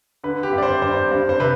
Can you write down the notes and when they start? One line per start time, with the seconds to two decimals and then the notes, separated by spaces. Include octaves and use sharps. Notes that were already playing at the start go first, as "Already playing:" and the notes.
0.24 D3 B4
0.43 G4
0.53 G2
0.58 D5
0.63 C5
0.82 G2 C5
1.11 G2
1.29 C5
1.40 C3 B4